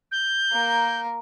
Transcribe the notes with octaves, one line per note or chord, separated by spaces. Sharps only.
G6
A#3 A#4